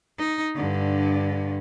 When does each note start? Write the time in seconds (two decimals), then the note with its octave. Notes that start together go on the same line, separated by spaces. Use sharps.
0.18 D#4
0.55 G2 D3